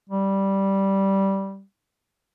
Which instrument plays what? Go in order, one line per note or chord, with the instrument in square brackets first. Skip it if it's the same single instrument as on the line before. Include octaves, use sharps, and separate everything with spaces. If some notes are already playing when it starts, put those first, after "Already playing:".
[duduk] G3